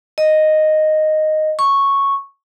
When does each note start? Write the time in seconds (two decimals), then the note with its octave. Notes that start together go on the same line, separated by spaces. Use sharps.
0.18 D#5
1.59 C#6